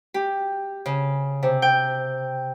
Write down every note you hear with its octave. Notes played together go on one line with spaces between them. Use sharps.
G4
C#3
C3
G5